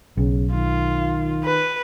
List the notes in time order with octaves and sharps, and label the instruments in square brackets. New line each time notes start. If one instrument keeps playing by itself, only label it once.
[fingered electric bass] B1 [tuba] C#3
[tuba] D#3 [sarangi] F4
[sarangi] B4